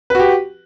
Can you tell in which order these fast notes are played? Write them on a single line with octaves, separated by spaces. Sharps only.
B4 F#4 G4